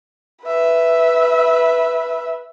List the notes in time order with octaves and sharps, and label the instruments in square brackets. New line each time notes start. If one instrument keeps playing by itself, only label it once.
[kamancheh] B4 E5